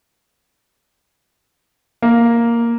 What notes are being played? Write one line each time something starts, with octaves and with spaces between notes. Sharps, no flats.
A#3